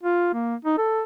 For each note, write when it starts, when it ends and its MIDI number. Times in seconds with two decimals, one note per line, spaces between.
0.03 0.30 65
0.34 0.55 58
0.65 0.77 63
0.78 1.03 69